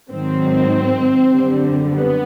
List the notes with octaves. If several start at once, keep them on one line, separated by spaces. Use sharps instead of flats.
G#2 D#3 F#3 C4
F#2 D3 G3
B3